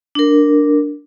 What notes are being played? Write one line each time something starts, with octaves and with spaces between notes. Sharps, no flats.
D4 A#4